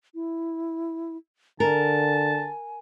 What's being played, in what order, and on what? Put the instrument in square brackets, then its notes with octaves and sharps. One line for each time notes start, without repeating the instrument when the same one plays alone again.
[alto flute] E4
[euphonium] D3 [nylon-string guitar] A#4 [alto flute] G#5 [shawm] A5